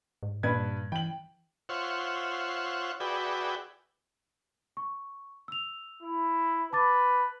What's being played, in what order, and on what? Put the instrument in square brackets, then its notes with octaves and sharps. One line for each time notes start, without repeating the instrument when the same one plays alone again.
[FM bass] G#2
[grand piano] G2 B4 G#6 [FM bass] A#2
[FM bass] E3 [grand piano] G5 F#7
[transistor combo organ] F4 C5 C#5 E5 F#5
F#4 G#4 B4 D5 E5 G5
[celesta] C#6
E6 F7
[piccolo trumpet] E4
[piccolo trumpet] B4 [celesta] A5 D6 A6